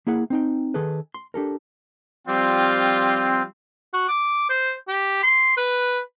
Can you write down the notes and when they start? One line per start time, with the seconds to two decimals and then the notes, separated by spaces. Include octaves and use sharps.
0.07 A#3 E4 G#4 F#5
0.30 C4 D#4 G5
0.74 D#3 G#4 A4 B4
1.14 C6
1.34 D4 G4 A4 A#4
2.27 F3 G3 C4 F4
3.93 F#4
4.09 D6
4.49 C5
4.88 G4
5.23 C6
5.57 B4